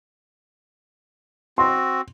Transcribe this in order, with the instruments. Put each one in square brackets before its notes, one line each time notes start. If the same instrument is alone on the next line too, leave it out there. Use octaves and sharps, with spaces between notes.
[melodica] C4 F#4 [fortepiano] C6